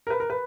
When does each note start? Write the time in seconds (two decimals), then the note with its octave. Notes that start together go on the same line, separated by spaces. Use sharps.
0.07 A#4
0.10 B4
0.20 A#4
0.30 B4